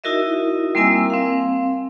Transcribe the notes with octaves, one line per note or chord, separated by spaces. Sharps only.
D#4 E4 F#4 A#4 D#5 E5
G3 A#3 C4 A#4 G#5 E6
C4 F5